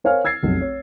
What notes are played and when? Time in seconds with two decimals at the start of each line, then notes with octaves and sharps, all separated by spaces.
0.04 A#4 C5 C#5 F5 G#5 F6
0.25 E6 G#6 A6 C7
0.43 F1 B1
0.61 C#5